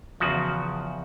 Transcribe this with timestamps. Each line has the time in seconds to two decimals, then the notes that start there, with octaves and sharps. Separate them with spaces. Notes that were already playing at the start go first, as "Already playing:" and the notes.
0.20 E2 C#3 F3 F#4